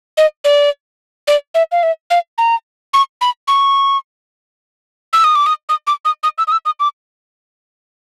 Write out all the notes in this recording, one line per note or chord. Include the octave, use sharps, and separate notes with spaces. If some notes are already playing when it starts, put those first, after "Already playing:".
D#5
D5
D5
E5
F5
E5
F5
A#5
C#6
B5
C#6
E6
D#6
D6
D#6
D#6
D6
D#6
D#6
E6
D#6
E6
D#6
D6